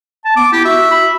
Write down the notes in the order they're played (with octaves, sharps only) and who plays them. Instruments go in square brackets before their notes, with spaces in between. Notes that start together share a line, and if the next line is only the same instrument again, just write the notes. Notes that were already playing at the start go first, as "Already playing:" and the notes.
[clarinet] A5
[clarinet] B3 [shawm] D6
[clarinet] E4 [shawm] G4
[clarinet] F#4 [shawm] E5
[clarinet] B5